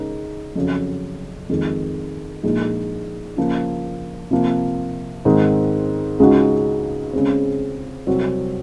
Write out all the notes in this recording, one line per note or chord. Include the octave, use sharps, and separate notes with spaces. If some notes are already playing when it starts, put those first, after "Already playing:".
Already playing: C#3 G#3 D#4 A#4
F2 C#3 F#3
F2 D#3 G#3
A#1 A#2 G#3 D#4
C#3 F3 A#3 F4
C3 F3 A#3
G#2 D#3 G#3 C4 D#4
C#2 C#3 G#3 D#4 F#4
C#3 G#3 C4
C2 C3 F#3 C4 F#4